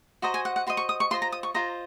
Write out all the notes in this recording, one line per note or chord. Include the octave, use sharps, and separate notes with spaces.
F#4 C5 D#5 A#5
G#5
F#5
F#5
F#4 C5 D#5 C6
C#6
D#6
C#6
F4 C5 D#5 C6
A#5
D#6
C#6
F4 C5 D#5 A#5